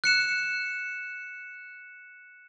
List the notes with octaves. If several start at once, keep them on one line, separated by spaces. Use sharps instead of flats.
F#6 C#7 E7